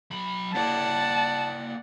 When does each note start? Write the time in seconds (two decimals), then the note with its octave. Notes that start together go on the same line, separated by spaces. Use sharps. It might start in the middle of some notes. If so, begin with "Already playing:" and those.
0.11 F#3 B5
0.54 A#3 E4 D5 F#5 A5